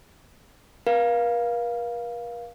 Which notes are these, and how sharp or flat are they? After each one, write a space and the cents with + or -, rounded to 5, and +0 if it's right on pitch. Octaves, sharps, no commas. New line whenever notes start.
A#4 +45 F5 +0